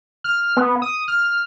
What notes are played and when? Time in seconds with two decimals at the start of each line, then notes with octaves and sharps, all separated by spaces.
0.24 F6
0.57 B3
0.82 D#6
1.08 F6